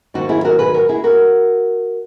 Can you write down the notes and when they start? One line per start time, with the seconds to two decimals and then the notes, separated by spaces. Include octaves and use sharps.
0.14 G#2 D#3 F#3 A#3 D#4 F#4
0.29 E4 G#4
0.45 F#4 A#4
0.59 G#4 B4
0.74 F#4 A#4
0.89 E4 G#4
1.04 F#4 A#4